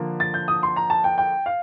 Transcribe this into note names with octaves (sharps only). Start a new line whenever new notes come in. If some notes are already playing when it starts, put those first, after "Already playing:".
Already playing: D3 F3 A#3
A6
G6
D#6
C6
A#5
A5
G5
G5
F5